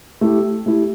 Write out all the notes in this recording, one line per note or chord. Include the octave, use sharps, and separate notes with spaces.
A3 E4 G4
A3 E4 G4